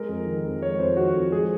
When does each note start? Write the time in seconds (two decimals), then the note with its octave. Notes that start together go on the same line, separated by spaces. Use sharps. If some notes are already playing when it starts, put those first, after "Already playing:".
Already playing: G#3 A#4
0.09 F2
0.26 D#3
0.45 F2
0.63 G#3 C#5
0.79 F2 C5
0.97 D#3 F#4
1.15 F2
1.32 G#3 G#4